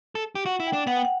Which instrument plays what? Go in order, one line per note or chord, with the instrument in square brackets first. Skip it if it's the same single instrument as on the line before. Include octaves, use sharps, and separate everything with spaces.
[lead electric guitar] A4
G4
[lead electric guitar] F#4 [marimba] F#5
[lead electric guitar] E4
[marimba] G5
[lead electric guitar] D4
[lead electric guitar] B3 [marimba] F#5
[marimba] G5
F#5